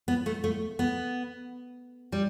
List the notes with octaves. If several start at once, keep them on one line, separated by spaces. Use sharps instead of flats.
B3
A3
A3
B3
G3